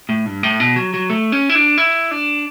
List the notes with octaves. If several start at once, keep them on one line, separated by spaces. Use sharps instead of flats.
A2
G2
A2
B2
F#3
F#3
A3
C#4
E4
D4
E4
D4